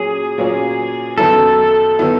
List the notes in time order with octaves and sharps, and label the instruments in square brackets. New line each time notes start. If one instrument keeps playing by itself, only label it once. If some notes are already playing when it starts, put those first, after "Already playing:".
Already playing: [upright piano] A#2 F#3 C#4 [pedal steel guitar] G#4
[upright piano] A#2 F#3 A#3 C#4
[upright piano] F#2 D#3 F#3 B3 E4 [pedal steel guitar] A4
[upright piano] D#3 F#3 B3 E4